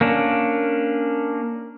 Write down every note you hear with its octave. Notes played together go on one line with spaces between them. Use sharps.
A#3 C#4 D4